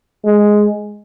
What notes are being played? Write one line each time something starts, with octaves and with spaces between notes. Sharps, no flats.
G#3